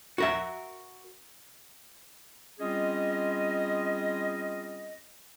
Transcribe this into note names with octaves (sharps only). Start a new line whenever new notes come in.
F#4 A#4 E5
G3 C4 C#4 F4 G#4 D#5